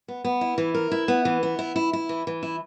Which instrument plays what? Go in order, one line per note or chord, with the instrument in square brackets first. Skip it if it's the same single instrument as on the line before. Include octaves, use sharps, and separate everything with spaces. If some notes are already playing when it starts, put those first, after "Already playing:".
[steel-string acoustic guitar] B3
B3
E4
E3
A#4
E4
B3
E3
B3
E4
E4
E4
E3
E3
E4